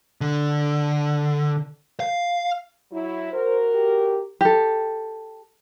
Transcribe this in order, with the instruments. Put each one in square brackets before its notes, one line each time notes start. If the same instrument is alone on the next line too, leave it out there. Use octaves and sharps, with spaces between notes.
[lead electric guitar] D3
F5
[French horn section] F#3 E4
[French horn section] F#4 A#4 [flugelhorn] C5
[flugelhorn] G4
[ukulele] G4 A4